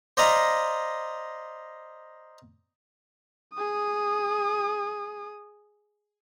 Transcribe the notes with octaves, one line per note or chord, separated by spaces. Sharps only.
C5 D5 D#5 F5 A#5 B5
G#4 D#6